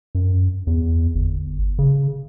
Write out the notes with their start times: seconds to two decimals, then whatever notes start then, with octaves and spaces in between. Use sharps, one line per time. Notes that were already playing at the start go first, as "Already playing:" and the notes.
0.15 F#2
0.67 E2
1.15 G1
1.79 C#3